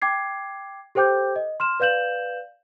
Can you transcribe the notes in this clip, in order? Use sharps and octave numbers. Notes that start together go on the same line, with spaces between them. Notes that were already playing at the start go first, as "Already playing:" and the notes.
G5 D6 G#6 C7
G4 A4 C5 G5 D6 G6
D#5
C6 F6 E7
B4 D5 F5 G6 E7 F#7